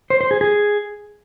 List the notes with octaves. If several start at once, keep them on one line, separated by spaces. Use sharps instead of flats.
C5
C5
G#4
G#4